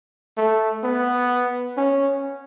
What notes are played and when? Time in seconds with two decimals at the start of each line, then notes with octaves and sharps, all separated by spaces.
0.37 A3
0.84 B3
1.77 C#4